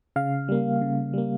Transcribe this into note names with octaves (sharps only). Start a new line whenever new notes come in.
C#3 F5
G3 A#3
C#3
G3 A#3